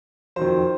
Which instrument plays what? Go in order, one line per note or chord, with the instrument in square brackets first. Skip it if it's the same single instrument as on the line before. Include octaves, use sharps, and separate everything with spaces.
[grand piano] F2 D#3 F#3 C5